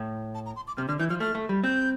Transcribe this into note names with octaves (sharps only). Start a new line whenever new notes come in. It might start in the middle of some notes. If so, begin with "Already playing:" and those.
Already playing: A2
A5
A#5
C6
D6
C3 F6
D3 F6
E3 G6
F3 F6
A3 F6
A3
G3
C4 G6